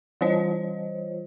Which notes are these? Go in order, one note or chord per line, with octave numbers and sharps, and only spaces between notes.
E3 G3 F4 C5 C#5 D#5